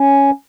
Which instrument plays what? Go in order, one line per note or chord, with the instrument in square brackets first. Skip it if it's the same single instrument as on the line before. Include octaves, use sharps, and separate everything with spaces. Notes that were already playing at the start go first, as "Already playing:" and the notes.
Already playing: [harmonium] C#4